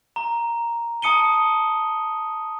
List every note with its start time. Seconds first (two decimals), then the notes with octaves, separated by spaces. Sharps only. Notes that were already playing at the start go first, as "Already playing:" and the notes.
0.16 A#5
1.02 A5 D#6 C#7 D#7 G7